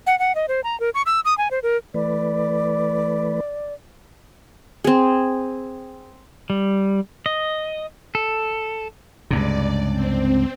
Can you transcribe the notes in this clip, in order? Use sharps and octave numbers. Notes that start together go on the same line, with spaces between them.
F#5
F#5
D#5
C5
A#5
A#4
C#6
E6
D#6
G#5
C5
A#4
E3 A3 B4 D5
C4 G#4
G3
D#5
A4
C#2 G2 C3 D5
C4